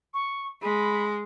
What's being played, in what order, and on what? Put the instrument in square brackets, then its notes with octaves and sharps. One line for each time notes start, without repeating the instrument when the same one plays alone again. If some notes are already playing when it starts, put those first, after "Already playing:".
[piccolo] C#6
[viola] G#3 [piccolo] B5